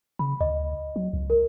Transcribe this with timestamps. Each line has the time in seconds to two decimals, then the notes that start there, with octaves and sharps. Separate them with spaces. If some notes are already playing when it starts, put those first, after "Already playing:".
0.19 C#3 B5
0.41 D2 D#5
0.96 F#3
1.13 C#2
1.30 A#4